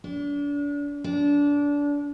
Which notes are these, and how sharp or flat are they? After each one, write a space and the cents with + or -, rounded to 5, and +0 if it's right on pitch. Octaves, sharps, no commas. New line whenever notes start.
D4 -35
D4 -25